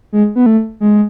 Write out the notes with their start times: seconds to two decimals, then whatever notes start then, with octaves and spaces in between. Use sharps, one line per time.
0.13 G#3
0.36 B3
0.46 A3
0.80 G#3